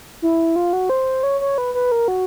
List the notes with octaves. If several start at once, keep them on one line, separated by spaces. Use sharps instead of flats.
E4
F4
F#4
C5
C#5
C#5
B4
B4
A#4
F#4